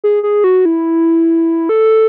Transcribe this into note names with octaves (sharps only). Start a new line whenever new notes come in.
G#4
G#4
F#4
E4
A4